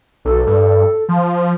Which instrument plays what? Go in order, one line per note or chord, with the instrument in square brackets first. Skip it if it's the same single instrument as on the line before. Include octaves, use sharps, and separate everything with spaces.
[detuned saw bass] B1 [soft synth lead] A4
[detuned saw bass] G2
F3